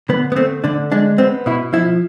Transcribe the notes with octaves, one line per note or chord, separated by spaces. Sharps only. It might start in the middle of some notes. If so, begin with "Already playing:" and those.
D3 B3
B3
A3 C4
D3 D4
G#3 D4
B3 C4
B2 E4
F3 E4